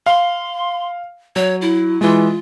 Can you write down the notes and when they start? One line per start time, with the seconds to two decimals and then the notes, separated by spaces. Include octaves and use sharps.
0.06 F5 C6
1.36 F#3 C#5
1.61 E4
2.01 E3 G#3 F4